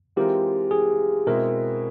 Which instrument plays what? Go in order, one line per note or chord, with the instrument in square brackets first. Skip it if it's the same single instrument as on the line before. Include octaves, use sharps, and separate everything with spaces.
[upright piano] E3 G#3 C4 F4 A#4 [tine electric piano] G4
[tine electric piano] G#4
[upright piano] B2 G#3 C4 E4 [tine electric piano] A#4